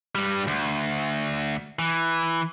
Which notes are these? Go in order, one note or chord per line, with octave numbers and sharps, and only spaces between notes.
G2 G3
D2
E3